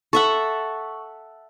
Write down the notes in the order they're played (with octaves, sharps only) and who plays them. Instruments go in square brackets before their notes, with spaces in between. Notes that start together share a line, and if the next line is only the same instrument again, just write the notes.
[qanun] A4 E5 F#5 [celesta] C#6